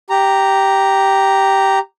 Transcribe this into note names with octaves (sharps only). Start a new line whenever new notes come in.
G4 A#5